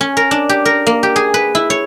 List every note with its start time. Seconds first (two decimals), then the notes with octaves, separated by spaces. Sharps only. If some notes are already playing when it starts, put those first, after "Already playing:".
0.01 C#4
0.17 A#4
0.31 D4
0.49 G4
0.65 A#4
0.87 A#3
1.03 G4
1.16 G#4
1.34 B4
1.55 E4
1.70 C#5